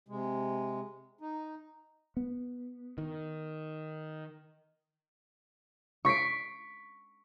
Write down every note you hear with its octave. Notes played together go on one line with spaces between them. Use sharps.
C3 G#3
D#4
B3
D#3
C#6 B6 C7 D7